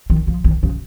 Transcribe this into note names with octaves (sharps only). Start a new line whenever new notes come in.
D#3
F3
D#3
C#3